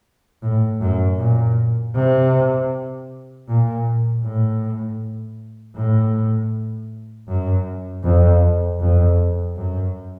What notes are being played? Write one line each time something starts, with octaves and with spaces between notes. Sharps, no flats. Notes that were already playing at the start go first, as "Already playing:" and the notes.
A2
F#2
A#2
C3
A#2
A2
A2
F#2
F2
F2
F#2